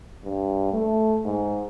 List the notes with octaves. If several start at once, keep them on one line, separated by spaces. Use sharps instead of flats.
G2
A3
G#2